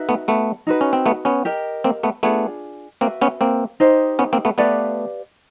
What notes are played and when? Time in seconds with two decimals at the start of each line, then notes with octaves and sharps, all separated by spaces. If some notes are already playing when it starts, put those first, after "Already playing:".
Already playing: D#4 F#4 B4 E5
0.09 A3 B3
0.28 A3 B3
0.67 D#4 F#4 B4
0.81 C#4
0.93 C4
1.06 A3 B3
1.25 B3 C#4
1.45 G4 A#4 D#5
1.84 A#3 C4
2.03 A3 B3
2.23 A3 B3 D4 F4 G#4
3.01 A#3 C4 F#4 B4 E5
3.21 B3 C#4
3.41 A#3 C4
3.80 D#4 G4 C5 D#5
4.19 B3 C#4
4.33 A#3 C4
4.45 A3 B3
4.58 A3 B3 G4 B4 D5 F5